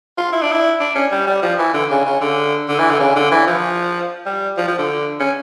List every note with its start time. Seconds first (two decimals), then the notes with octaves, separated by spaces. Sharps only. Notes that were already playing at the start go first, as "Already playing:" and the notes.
0.18 F4
0.32 E4
0.41 D4
0.52 E4
0.80 D4
0.95 C#4
1.11 G3
1.27 G3
1.42 F3
1.59 E3
1.74 D3
1.90 C#3
2.06 C#3
2.21 D3
2.69 D3
2.79 E3
2.90 D3
3.00 C#3
3.16 D3
3.31 E3
3.47 F3
4.26 G3
4.57 F3
4.68 F3
4.78 D3
5.20 C#4